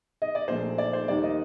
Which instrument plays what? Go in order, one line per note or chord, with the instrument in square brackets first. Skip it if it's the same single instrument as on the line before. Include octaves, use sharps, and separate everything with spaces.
[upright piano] D#5
D5
A#1 A#2 A3 C5
D5
C5
D#2 D#3 G3 A#3 D5
D#5